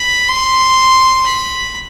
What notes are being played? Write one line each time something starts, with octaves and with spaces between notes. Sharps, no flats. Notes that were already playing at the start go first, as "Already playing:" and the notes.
Already playing: B5
C6
B5